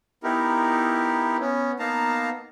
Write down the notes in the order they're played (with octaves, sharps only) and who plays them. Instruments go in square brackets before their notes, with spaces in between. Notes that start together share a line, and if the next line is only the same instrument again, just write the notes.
[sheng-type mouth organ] B3 D#4 E4 G4 A#4
B3 C#4
A#3 B3 D#4 F5 A5 A#5